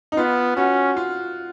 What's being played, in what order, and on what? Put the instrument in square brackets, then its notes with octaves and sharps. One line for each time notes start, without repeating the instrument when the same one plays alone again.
[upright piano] D#4
[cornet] B3 [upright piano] F4
[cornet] C#4 [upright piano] F#4
[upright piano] F4